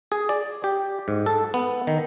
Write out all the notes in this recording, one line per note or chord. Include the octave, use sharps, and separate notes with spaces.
G#4
D5
G4
G#2
A4
B3
D#3